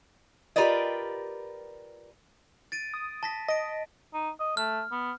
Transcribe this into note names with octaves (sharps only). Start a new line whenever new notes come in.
F4 G4 A#4 B4 D5 D#5
A6 D7 D#7
D#6
A5 A#6 B6
D#5 A#6 D7
D#4
D#5
A3 F6
B3